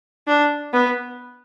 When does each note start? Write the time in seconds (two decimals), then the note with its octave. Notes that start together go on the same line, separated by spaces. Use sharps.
0.27 D4
0.74 B3